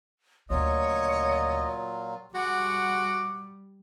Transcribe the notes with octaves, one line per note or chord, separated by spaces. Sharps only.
D2 A#2 C#3 F#3 F4 C#5 D#5
G3 G#3 F#4 F#5 D6